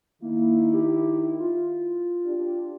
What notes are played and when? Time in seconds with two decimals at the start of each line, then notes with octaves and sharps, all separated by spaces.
0.22 D#3 A#3 E4
0.73 G4
1.39 F4
2.26 D4 G4